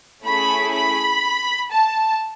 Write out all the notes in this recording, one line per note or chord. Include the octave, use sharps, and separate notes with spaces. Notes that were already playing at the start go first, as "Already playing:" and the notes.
A3 C#4 E4 G#4 B5
B5
A5